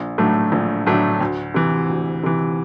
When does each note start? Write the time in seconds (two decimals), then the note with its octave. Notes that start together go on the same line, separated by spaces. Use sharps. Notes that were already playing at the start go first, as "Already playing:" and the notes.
Already playing: A#1
0.18 A2 F#3 A3 D4
0.52 A#1
0.86 A2 F#3 A3 D4
1.20 D2
1.54 C3 E3
1.89 D2
2.24 C3 E3